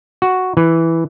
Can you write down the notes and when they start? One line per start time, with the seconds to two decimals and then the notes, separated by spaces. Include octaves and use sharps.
0.22 F#4
0.57 E3